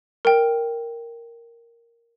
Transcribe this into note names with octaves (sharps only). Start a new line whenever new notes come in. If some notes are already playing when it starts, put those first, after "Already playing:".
A#4 G5